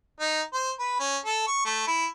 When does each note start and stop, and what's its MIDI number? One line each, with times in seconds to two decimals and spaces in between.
0.20 0.42 63
0.53 0.71 72
0.79 0.99 71
1.00 1.17 61
1.25 1.43 69
1.47 1.61 85
1.65 1.83 57
1.87 2.06 64